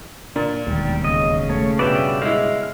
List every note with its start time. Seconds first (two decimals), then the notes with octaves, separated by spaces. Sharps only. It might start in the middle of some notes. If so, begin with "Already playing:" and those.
0.36 A#2 D4
0.67 E1 D#2 G3
1.04 C#3 D#5
1.50 A3 C#5
1.79 G2 B2 B4 D5 E5 G5
2.22 G#3 E4 F5